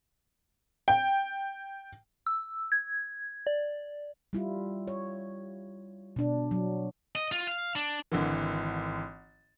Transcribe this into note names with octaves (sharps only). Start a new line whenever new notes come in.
G5
E6
G#6
D5
G3 E4 F4
C#5
B2 D4
F#3
D#5
F4
F5
D4
G#1 D3 E3